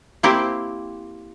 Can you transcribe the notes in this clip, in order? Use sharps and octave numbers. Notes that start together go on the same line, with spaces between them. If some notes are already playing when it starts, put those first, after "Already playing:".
A#3 C4 E4 G4 C5